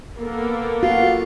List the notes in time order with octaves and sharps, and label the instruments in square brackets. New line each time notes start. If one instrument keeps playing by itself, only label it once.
[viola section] A#3 B3 A4
[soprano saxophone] F4 [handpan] F#4